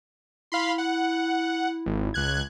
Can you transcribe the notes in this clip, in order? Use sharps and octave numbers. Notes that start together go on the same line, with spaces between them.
E4 F5 B5 C6
F#5
G#1
C#2 F#6 G#6